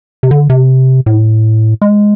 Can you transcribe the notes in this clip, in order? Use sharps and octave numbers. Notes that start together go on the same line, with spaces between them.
C3
D3
C3
A2
G#3